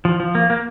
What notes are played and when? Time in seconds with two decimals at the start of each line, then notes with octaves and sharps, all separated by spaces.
0.05 F3
0.20 F3
0.35 A#3
0.50 A#3